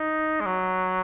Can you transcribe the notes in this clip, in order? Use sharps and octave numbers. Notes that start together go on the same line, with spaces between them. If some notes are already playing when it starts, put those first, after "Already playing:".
Already playing: D#4
G#3
F#3